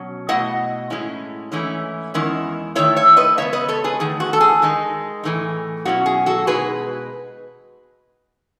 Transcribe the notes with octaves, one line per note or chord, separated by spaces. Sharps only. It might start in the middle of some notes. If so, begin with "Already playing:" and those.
Already playing: B2 F#3 C#4
B2 A3 E4 D#5 F#5
A2 G#3 C#4 E4
G#2 E3 A3 C#4 E4
E2 D#3 G#3 C#4 E4
D#3 A3 E4 C#5 E5
C#5 E5
B4 D#5
C#3 G#3 B3 C#5 E5
B4 D#5
A4 C#5
G#4 B4
E2 D#3 A3 G#4
F#4
A4
G#4
D#3 G#3 D#4
A2 E3 A3 D#4
B2 F#3 C#4 E4 F#4
G#4
F#4 A4
B2 G#3 D#4 G#4 B4